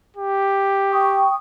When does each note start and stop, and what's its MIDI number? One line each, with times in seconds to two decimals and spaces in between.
0.16 1.26 67
0.92 1.36 79
0.92 1.36 85
0.92 1.36 87